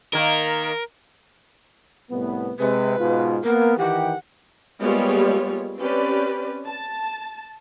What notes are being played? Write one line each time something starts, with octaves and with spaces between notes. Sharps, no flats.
D#3 A#3 A#4
C2 A2 B3
C3 G#3 B4
G#2 B2 F4
A#3 B3 A#4
D#3 E3 G4 F#5
G3 G#3 A#3 B3 F4 C#5
C4 C#4 G4 B4 D5
A5